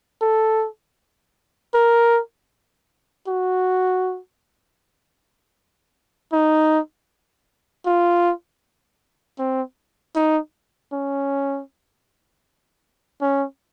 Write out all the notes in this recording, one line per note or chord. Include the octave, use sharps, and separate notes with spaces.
A4
A#4
F#4
D#4
F4
C4
D#4
C#4
C#4